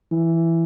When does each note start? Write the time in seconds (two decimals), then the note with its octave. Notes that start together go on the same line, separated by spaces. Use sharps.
0.12 E3